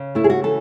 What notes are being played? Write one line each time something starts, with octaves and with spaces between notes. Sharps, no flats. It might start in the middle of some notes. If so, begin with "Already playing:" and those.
Already playing: C#3
A3 E4
G#4
F#4
E3 A4